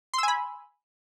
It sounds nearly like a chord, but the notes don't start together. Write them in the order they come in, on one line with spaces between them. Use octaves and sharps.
C6 E6 G#5 B5